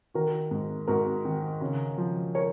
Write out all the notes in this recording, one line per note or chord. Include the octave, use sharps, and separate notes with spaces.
D#3 F#4 A#4
G#2
G#2 F#4 A#4
D#3
C#3
F3
A#4 C#5